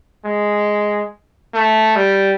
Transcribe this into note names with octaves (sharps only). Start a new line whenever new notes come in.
G#3
A3
G3